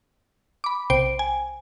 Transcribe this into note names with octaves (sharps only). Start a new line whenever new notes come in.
B5 D6
B1 C3 C5 G5 D7
G#5